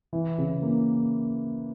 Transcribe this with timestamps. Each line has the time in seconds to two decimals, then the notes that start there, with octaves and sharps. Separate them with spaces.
0.13 E3
0.38 C#3
0.62 A#3